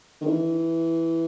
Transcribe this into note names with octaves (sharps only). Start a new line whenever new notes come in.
D#3
E3